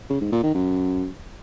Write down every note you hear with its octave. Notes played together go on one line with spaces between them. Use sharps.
C#3
G#2
A#2
D#3
F#2